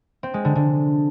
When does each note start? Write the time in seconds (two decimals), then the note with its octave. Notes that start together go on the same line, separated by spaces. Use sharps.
0.23 C4
0.34 G#3
0.45 D3
0.55 D3